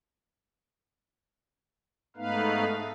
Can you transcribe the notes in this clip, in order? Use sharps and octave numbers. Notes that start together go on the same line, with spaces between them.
G#2 A3 B3 D#4 B4 F5